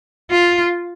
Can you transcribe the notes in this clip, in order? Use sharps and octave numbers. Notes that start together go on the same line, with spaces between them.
F4